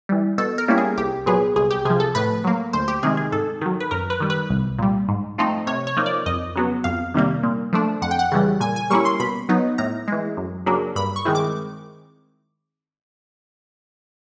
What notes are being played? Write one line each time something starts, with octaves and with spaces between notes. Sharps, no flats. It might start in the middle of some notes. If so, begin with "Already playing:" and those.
E3 G3
B2 A4
A#4
G3 A#3 C#4 E4
G#4
C2 G4
A#2 F#3 B3 G#4
C2 G#4
G4
C3 F3 G#4
A4
A2 B4
F#3 A#3
D2 C5
G4
C3 D#3 G#3 G#4
G#4
G#2 A4
D#3 F#3
B4
F#2 A#4
B4
D#3 G3
B4
C2
A#2 G3
G#2
F3 A3 C4 D#4
C3 C#5
C#5
F3 A#3 D#4
D5
F2 D#5
C#3 F#3 B3
F2 F5
C3 D#3 G3 A#3
A#2
F3 A3 D4
F2 F#5
G5
F#5
C#3 E3 G3
A#2 G#5
G#5
G3 A#3 C#4 E4 C#6
C6
B2 B5
F#3 B3 D#4
A2 A#5
E3 G#3
F#2
C#3 F#3 A#3 D4
G2 B5
C#6
D#3 G#3 C4 E4
D6